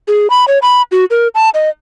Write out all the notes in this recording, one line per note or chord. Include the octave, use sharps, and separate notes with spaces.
G#4
B5
C#5
B5
F#4
A#4
A5
D#5